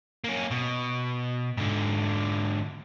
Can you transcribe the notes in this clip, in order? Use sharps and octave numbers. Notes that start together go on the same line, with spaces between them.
A#3 C#4
B2
G#2 D3